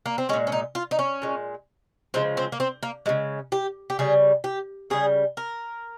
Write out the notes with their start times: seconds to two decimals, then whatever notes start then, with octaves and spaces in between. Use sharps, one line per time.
0.06 A#3
0.18 C4
0.29 G#3 C#4
0.33 A#2
0.47 C#4
0.52 D#4
0.75 F4
0.91 D#4
0.99 C#4
1.22 A#2 G#3
2.14 C#3 F3 G#3 C4
2.37 C4
2.52 A#3
2.60 C4
2.83 A#3
3.06 C#3 F3 G#3
3.52 G4
3.90 G4
3.99 C#3 G3 G#4
4.44 G4
4.90 C#3 G3 G#4
5.37 A#4